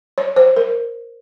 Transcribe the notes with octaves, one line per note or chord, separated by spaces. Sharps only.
C#5
C5
A#4